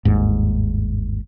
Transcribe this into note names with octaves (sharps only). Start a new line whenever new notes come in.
G1 D#2 G#2